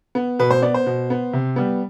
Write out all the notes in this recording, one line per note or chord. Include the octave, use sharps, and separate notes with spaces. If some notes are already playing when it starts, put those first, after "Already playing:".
B3
B2 B4
C5
B3 D5
C5
B2
B3
C3
G3 B3